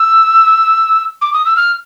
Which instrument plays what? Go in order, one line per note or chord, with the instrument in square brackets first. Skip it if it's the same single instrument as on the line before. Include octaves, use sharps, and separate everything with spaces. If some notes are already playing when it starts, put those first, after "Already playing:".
Already playing: [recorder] E6
D6
D#6
E6
F6